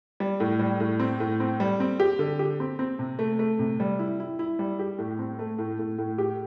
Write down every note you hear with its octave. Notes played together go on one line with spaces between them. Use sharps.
G3
A2
G3
A2
C4
A2
C4
G3
C4
G4
D3
G4
C4
C4
C3
A3
A3
C3
G3
E4
E4
E4
G3
G4
A2
C4
A3
A2
A2
A2
G4